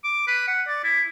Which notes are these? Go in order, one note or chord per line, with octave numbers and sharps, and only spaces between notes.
D6
B4
F#5
D5
E4